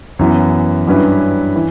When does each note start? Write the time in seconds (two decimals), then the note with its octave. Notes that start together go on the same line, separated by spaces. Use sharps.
0.19 F#2 E3 B3
0.87 G2 F#3 C#4 E4 B4
1.56 E3